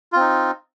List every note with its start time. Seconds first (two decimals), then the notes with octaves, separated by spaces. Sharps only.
0.12 F4
0.16 C4
0.20 D#4